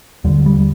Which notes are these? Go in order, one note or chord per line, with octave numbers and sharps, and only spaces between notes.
D#2 D3 G3
G3